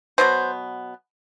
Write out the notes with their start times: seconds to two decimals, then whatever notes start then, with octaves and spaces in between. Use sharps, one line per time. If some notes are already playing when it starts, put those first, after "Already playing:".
0.18 B2 F#3 B3 C5